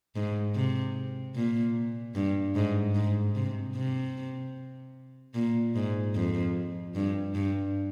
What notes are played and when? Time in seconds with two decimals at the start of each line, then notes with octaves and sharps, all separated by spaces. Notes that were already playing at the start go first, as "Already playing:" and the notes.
0.16 G#2
0.55 C3
1.35 A#2
2.15 G2
2.55 G#2
2.95 G#2
3.35 C3
3.75 C3
5.35 A#2
5.75 G#2
6.15 F2
6.95 G2
7.35 G2